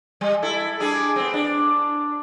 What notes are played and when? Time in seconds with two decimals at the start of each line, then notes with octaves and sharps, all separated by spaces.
0.21 G3
0.42 E4 A4
0.80 G3 D4 G#4
1.16 B3 C4
1.34 D4